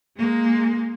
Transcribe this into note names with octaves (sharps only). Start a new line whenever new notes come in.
G#3 A#3